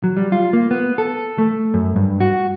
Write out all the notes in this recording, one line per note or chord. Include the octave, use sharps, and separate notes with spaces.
F#3
G3
F4
A#3
B3
A4
A3
F#2
G2
F#4